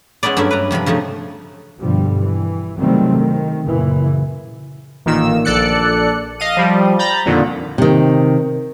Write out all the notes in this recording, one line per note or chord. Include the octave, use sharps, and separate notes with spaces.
G#3 B3 C#4 E4 D5
G2 F#3 A3 C#4 E5 B5
B4 D5 A#5
G2 C3 F3 B5
C#3 F3 A3 D#4
G2 B2 D3 F3 G3
E3
C3 D#3 F#3 G3 A3 C4
D#3
F#1 A#2 C#3 E3
A1 A#2 D#3 E6
A#1 A4 D5 F#6 C#7
D#5 F5 D#7
F3 G3
A#5 B5 G6 A6
F2 A#2 D3 D#3
C3 D#3